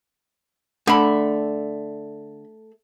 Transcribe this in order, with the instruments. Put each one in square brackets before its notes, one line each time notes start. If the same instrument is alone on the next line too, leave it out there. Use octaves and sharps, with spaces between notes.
[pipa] D3 B5 [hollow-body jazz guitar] A3